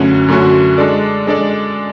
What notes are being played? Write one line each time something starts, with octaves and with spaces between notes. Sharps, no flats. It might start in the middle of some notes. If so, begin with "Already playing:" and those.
Already playing: F#2 D3 A3 C#4 F#4
F#2 D3 A3 C#4 F#4
G#3 D4 A4 D5
G#3 D4 A4 D5